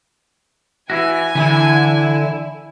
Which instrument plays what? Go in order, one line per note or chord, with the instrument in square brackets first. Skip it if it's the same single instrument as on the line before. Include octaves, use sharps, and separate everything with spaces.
[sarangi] E3 [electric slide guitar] E4 F#4 [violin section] G#5
[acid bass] D3 [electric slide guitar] E3 [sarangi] E4